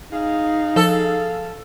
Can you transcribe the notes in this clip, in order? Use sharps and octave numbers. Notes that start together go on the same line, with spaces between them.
D#4 G#4 F5
F3 A4